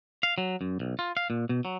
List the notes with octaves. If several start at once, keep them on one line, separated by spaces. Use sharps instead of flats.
F5
F#3
F#2
B1
F4
F5
A#2
B2
F#3